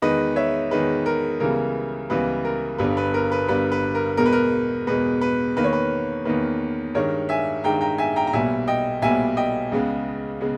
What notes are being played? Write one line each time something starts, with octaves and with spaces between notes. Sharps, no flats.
E2 D#3 G#3 B4 D#5
C#5 E5
E2 D#3 G#3 B4
A#4
C#2 C#3 E3 G3 B3 A#4
C#2 C#3 E3 G3 B3 B4
A#4
G1 G2 G3 B3 B4
B4
A#4
B4
G1 G2 G3 B3 B4
B4
A#4
E2 B2 G#3 A#4
B4
A#4
E2 B2 G#3 B4
B4
E2 D#3 A#3 B4
C#5
B4
E2 D#3 A#3 B4
G2 D#3 G#3 A#4 C#5
E5 G#5
G2 D#3 G#3 G5 A#5
G5 A#5
E5 G#5
G5 A#5
A#5
B1 A#2 G3 B3 E5 G#5
D#5 G5
B1 A#2 G3 B3 E5 G#5
D#5 G5
C#2 C#3 G#3 B3
C#3 G#3 B3